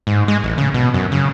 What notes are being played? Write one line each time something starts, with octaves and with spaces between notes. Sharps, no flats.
G#2
G#3
A1
C#3
B2
F#2
C#3